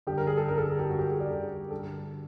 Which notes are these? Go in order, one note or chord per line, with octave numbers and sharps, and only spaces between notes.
G2 D3 G4
A#4
G#4
A4
G2 D3 A#4
A4
G#4
G4
G2 D3 F#4
G4
G#4
D5
G2 D3 A4
G2 D3 A4